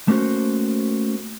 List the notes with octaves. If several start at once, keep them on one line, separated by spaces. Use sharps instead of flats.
A3 A#3 C#4 F#4 C5